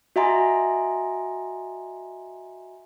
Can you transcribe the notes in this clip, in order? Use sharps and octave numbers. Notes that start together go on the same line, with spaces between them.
F#4 D#5 E5 G#5 A#5 C6